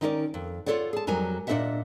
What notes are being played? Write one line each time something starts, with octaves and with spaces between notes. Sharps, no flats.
D#3 C#4 D#4 E4 A#4 D5
F2
F4 G4 A4 C#5 D5 F#5
G#4 A5
F2 F#3 G3 A#4 G#5
A#2 D4 A#4 D#5 E5 F#5